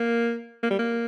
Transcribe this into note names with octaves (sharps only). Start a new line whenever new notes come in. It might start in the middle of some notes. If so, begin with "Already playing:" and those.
Already playing: A#3
A#3
G3
A#3